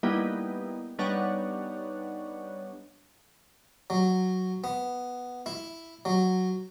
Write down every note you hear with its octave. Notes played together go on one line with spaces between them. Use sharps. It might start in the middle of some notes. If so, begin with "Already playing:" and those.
G3 A#3 B3 D#4 E4 G4
G3 B3 D4 D#4 C#5 F#5
F#3
B3
E4
F#3